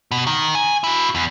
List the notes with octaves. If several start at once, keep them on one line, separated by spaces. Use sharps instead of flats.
B2
D#3
G#5
E4 F#4
E2